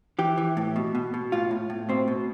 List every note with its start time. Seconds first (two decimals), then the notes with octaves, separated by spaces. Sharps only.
0.19 E3 G4
0.37 E3
0.57 A2
0.76 B2
0.95 B2
1.14 B2
1.32 A2 F4
1.51 A2
1.70 A2
1.89 B2 C4
2.08 B2